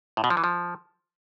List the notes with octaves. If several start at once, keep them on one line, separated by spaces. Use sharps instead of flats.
A2
B2
F3
E3
F3